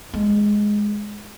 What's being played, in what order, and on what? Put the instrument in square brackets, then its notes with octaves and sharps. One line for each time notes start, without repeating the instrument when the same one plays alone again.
[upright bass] G#3